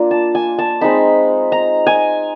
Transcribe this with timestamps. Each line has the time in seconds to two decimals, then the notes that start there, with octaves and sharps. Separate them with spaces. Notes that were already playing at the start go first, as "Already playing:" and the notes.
Already playing: A#3 D4 F4
0.11 A5
0.35 G#5
0.58 A5
0.81 G#3 C4 D#4 B5
1.52 A#5
1.87 G#5